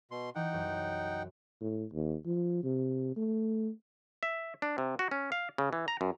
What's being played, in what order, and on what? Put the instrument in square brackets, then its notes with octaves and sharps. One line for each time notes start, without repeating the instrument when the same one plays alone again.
[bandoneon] B2 C6
[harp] E3 [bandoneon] D#4 F#5 G5
[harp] C2 F#2 C3
D7
[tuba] A2
D#2
F3
C3
A3
[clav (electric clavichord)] E5
D4
C3
F#4
C#4
F5
C#3
E3
A#5
F#2